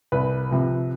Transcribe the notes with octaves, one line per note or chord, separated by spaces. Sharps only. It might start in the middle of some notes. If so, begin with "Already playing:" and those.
C2 B4
C3 F3